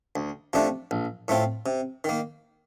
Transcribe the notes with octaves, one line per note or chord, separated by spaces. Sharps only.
D2
C3 F3 A3 D4
A#1
A2 A3 C4 F4
C3
D#3 A#3